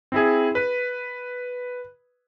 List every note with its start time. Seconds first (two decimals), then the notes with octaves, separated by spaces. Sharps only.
0.12 C4 E4 G#4
0.55 B4